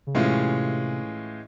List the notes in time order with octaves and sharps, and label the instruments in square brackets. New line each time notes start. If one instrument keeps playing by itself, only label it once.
[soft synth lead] C#3
[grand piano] A2 E3 G#3 C#4 F4 [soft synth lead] C3